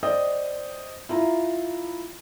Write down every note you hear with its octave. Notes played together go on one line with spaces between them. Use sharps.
C5 D5 D#5 G5 D#6
E4 F4 A#5